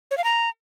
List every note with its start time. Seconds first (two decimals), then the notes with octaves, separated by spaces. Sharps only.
0.11 C#5
0.18 F5
0.24 A#5